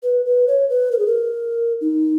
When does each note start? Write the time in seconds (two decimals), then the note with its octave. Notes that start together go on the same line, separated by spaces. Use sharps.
0.03 B4
0.25 B4
0.48 C#5
0.69 B4
0.92 A#4
0.99 G#4
1.07 A#4
1.81 D#4